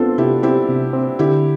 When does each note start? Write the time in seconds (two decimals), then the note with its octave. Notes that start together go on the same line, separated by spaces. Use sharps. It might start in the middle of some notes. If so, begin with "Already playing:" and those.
Already playing: B3 C4 D4 F4 A4
0.18 C3 E4 G4
0.43 C4 E4 G4
0.69 C3
0.93 C4
1.19 D3 E4 G4